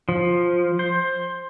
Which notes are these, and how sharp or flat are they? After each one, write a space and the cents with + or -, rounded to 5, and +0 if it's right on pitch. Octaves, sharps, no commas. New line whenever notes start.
F3 +5
C5 +15